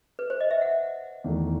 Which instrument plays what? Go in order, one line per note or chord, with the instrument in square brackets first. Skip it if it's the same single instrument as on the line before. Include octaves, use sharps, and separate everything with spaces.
[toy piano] B4
C5
D#5
E5
F#5
[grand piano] E2 D#3 A3